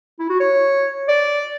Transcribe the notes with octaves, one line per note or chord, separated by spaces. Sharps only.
E4
F#4
C#5
D5